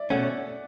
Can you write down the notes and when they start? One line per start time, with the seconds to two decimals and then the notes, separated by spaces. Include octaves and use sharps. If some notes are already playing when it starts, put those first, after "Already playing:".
Already playing: D5 E5
0.10 B2 A3 C#4 F#5